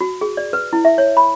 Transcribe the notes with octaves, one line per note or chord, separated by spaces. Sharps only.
F#4
G#4
D5
B4
E4
E5
C#5
B5